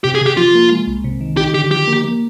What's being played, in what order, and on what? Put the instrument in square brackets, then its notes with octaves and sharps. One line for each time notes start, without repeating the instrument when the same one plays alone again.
[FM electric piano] C3 [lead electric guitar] G4
[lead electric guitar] G#4
[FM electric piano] C3 [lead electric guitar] G4
[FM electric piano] F3 [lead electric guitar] F4
[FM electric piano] A#3
G#3
C2
C3
D#3
[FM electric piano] D#4 [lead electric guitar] G4
[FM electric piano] D3 [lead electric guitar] G4
[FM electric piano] F3 [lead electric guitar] G4
[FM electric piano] A#3
A#3